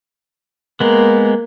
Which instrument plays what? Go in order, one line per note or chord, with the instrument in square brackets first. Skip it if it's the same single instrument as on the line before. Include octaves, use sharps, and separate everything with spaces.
[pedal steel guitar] G#3 B3 [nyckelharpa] A#3